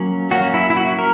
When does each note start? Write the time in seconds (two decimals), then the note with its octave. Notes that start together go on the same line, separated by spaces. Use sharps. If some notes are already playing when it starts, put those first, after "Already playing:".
Already playing: F#3 A#3 C#4
0.31 F#3 A#3 C#4 F#4
0.54 E4
0.70 E4
0.77 F#4
0.99 A#4